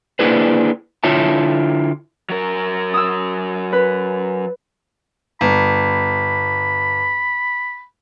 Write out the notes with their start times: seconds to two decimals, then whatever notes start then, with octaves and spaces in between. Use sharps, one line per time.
0.19 A#3 D4 E4 G#4 B4 C5
1.04 D3 E4 F4 C#5 E5 A5
2.30 F#3 A#4
2.94 D#6 E6
3.73 B4
5.41 G1 B5